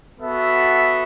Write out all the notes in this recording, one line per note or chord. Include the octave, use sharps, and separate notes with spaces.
B3 F#4 A4 E5